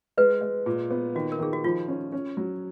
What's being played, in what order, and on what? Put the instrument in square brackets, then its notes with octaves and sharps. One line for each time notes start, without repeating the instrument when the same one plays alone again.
[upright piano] G#3 [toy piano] B4
[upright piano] G#3
A#2
B3
[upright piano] D#3 [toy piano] F#4
[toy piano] A#4
[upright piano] D#3 [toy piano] G#4
[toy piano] F#4
[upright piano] F3 [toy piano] F4
[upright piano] C#4
C#4
F#3